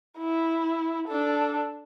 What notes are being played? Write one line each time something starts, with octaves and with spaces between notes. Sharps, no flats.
E4
D4 A4